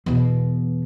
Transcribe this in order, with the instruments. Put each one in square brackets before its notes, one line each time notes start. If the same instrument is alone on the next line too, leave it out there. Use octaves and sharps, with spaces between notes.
[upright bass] E2 B2